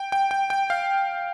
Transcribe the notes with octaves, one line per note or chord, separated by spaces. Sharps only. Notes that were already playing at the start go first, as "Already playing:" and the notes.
Already playing: G5
G5
G5
G5
F5